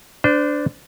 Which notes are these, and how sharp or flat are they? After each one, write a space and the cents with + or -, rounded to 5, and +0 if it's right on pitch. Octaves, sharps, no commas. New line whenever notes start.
D4 +0 C5 -35